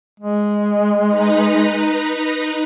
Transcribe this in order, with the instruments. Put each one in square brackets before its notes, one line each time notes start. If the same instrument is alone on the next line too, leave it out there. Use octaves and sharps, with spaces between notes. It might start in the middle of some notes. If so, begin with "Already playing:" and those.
[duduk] G#3
[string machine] D#4 B4 A#5